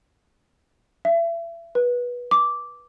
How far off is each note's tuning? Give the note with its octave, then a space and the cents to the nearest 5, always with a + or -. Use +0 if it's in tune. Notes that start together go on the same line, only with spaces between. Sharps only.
E5 +35
B4 -20
D6 -10